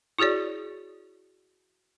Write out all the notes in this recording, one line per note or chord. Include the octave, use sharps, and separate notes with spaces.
E4 F#4 G#4 C#5 D5